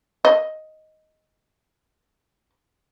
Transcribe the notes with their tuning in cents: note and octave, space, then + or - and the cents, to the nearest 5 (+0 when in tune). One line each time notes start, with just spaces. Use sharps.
D#5 +5